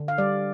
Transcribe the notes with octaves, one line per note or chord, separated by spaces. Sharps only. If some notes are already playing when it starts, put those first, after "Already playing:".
Already playing: D3
F5
G3 D5